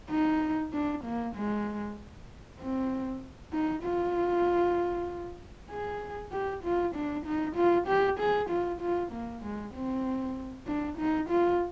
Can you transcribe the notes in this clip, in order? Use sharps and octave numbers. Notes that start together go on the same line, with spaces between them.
D#4
D4
A#3
G#3
C4
D#4
F4
G#4
G4
F4
D4
D#4
F4
G4
G#4
F4
F4
A#3
G#3
C4
D4
D#4
F4